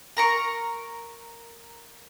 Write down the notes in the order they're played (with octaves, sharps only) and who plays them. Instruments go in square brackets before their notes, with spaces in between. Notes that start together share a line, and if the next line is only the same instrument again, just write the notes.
[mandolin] A#4 A#5 C#6